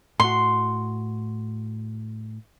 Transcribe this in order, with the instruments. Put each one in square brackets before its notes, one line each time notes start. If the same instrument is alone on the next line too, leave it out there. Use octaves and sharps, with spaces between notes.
[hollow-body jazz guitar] A2 F#4 [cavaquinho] C6